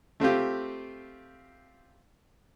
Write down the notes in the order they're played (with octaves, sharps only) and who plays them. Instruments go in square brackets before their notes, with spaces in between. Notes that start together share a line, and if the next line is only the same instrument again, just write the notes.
[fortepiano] A3 C4 F4 G4